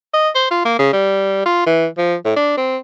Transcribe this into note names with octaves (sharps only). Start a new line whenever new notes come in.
D#5
C5
F4
A#3
C#3
G3
F4
E3
F3
A2
D4
C4